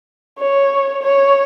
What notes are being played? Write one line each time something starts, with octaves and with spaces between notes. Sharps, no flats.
C#5
C#5